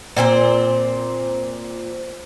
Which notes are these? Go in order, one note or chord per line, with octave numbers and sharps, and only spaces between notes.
A#2 C4 G#4 C5